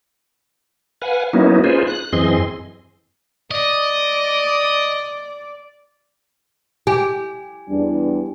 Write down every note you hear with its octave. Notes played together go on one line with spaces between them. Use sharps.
B4 F5 F#5 G#5
F#3 A#3 B3 C#4 D#4 E4
C#4 D#4 F4 G#4 B4 C5
F#6
F#2 E3 C4 G#4 D#5 C6
D5 D#5
G4 G#5
E2 G3 D4